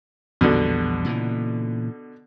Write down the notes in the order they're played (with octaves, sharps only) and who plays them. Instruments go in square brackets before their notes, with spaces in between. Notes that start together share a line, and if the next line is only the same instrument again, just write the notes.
[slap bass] A#1 E2 G3 [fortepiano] B2 D3
[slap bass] A#2 C#3 E3